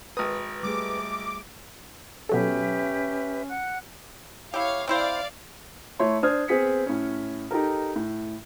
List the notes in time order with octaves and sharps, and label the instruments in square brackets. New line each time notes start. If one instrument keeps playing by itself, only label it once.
[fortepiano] G#1 D#6 [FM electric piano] B4
[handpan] G3 A3 G#4 [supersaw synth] D6
[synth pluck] B2 F#3 A4 [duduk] C#4 [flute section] G4 B4 E5
[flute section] F#5 F#6
[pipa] E4 G4 [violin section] C#5 F5
[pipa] C4 E4 C5 [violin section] D5 F5
[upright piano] A3 E4 C#5 C6
D4 C5 D#6 F6 G#6
B3 C4 G#4 B6 C#7
A2 C#4
D#4 G4 A4 A#4
A2